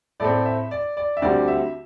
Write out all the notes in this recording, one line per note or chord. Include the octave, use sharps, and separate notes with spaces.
A2 A3 C4 D5
E5
D5
D5
E5
D2 D3 G3 C4 D5
E5